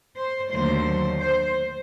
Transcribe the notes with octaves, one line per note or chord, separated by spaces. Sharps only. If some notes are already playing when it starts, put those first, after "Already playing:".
C5
D#2 D3 F#3 A3 C5
C5